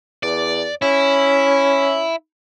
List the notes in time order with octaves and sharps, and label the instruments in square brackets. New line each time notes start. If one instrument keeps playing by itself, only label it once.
[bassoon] E2 [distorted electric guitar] D5
[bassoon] C#4 [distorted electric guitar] E4